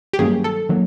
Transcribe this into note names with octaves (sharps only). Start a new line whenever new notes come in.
G4
G2 D#3 F#3 A#3 C#4 G#4
A4
D#3 F#3 A#3